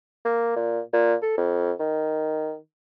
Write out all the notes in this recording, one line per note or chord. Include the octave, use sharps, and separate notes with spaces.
A#3
A#2
A#2
A4
F2
D#3